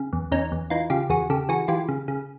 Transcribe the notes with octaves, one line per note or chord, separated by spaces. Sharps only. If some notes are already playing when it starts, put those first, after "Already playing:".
Already playing: C#3
E2
E2 C#4 D#4
E2
E3 D#4 F4
C#3 F4 G4
E2 F#4 G#4
C#3 G4 A4
E3 F#4 G#4
E3 F4 G4
C#3
C#3